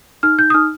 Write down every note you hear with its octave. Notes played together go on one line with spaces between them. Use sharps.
D#4 F6
D#4 G6
D#6
D#4 F6